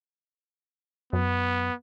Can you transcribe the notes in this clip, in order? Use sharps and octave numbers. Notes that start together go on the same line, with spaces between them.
F#2 B3